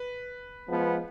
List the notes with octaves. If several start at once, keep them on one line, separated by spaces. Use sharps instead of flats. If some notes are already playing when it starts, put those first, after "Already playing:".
Already playing: B4
F3 G#3 B3